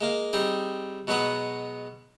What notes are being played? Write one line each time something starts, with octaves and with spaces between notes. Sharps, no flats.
G#3 A#3 F5
G3 C4 D#4 G#4
B2 F#3 G#3 B3 B4 D#6